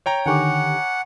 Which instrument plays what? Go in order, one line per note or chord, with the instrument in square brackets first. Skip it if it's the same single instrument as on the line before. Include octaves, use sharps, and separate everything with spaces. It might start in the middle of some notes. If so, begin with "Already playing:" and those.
[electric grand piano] C#5 G5 A#5
[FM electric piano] D3 D#3 G4 [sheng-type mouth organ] F#5 [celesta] G#5 C#6 D6